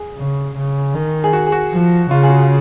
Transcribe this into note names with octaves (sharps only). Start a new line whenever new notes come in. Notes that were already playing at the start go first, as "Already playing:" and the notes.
Already playing: G#4
C#3
C#3
D#3
G#4
F#4
G#4
F#4
F3
C#3 F4
G#4
F#4